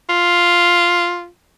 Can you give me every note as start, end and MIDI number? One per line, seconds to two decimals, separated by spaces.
0.09 1.27 65